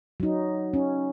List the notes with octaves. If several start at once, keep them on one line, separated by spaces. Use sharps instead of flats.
F#3 D#4
C#4